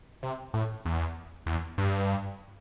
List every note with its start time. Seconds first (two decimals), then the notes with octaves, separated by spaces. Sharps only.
0.23 C3
0.54 A2
0.85 E2
1.46 E2
1.78 G2